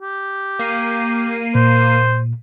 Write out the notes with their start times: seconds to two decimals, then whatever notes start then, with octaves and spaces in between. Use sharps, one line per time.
0.02 G4
0.59 A#3 C7 D#7
1.55 A#2 C5